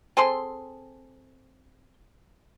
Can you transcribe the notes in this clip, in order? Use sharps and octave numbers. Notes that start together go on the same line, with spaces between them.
C4 G#4 A4 C6